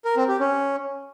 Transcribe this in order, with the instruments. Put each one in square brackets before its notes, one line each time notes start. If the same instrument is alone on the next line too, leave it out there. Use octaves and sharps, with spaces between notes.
[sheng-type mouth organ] A#4
C4
G4
C#4